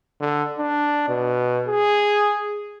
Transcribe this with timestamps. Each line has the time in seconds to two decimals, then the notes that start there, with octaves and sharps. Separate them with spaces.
0.20 D3
0.58 D4
1.08 B2
1.67 G#4